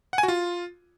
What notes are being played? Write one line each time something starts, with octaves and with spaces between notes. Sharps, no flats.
F#5
G#5
F#4
F4